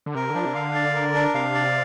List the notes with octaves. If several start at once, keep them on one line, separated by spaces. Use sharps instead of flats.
D3
C3 A#4
D3
F3 D4
C3
D3 F5
D5
A#4
D4
C3 F5
D5